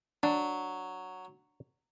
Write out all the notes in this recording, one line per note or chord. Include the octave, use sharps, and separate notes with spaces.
F#3 D4